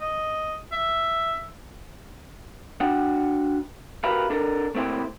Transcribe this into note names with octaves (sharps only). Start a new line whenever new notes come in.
D#5
E5
D4 F#4 F#5 G5
F#4 G4 A#4 B4 E5 F5
D4 A4 A#4
A3 A#3 C4 E4 G4 C5